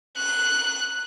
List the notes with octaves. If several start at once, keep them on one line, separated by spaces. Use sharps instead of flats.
F#6